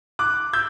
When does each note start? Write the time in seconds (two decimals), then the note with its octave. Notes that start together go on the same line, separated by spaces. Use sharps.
0.19 D6 F#6
0.53 E6 G6